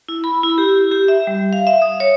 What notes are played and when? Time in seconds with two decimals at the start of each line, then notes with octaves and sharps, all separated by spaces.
0.09 E4
0.24 B5
0.43 E4
0.58 G4
0.91 G4
1.08 E5
1.27 G3
1.53 F5
1.67 E5
1.82 D#6
2.00 C#5